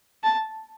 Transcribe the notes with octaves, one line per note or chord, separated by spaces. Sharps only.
A5